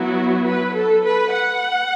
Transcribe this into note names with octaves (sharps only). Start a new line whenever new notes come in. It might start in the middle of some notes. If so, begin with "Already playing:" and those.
Already playing: F#3 B3 E4 F#4
B4
A4
B4
F#5